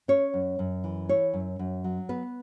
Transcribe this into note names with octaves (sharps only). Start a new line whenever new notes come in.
C#4 C#5
F#2
F#2
E3
E4 C#5
F#2
F#2
F#3
B3 B4